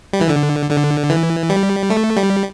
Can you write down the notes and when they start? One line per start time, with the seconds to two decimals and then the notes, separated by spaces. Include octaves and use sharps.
0.13 G3
0.21 E3
0.30 D3
0.71 D3
1.10 E3
1.50 G3
1.90 A3
2.17 G3